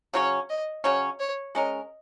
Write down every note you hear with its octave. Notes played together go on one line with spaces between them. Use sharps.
C#3 F#3 C#4 C#5
D#5
C#3 F#3 C#4 C#5
C#5
G#3 C#4 A#4 D#5